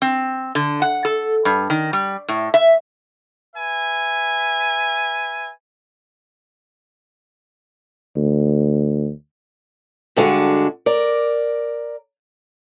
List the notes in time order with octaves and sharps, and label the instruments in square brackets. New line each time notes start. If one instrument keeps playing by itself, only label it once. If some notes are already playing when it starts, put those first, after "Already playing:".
[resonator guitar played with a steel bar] C4
D3
F#5
A4
G2
D#3
G3
A2
E5
[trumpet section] B4 E5 G#5
[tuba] D2
[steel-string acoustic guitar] G2 D3 G#3 D4 F#4
A#4 D5